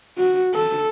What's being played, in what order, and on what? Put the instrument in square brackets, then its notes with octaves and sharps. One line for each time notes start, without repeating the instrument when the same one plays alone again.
[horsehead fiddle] F#4
A4